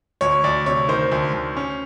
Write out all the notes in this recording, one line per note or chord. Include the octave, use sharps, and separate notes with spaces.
D2 C#5
D2 D5
C3 C#5
D#3 C5
D2
D2
C#4